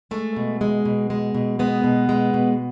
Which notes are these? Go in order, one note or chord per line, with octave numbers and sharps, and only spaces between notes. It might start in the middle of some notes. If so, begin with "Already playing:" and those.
G#3 A3
B2
G#3
B2
G#3
B2
G#3 B3
B2
G#3
B2